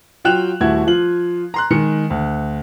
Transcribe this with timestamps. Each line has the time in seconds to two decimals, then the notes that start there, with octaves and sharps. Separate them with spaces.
0.25 F#3 F4 G5 F#6 E7 F7
0.61 D#1 A3 E4 F#4 G#6
0.87 F3 F4 F#7
1.54 A#5 C6 F#6
1.70 D#3 G#3 C#7
2.10 D2